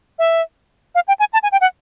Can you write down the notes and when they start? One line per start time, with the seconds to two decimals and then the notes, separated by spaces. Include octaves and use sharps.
0.19 E5
0.95 F5
1.08 G5
1.19 G#5
1.33 A5
1.43 G#5
1.52 G5
1.61 F#5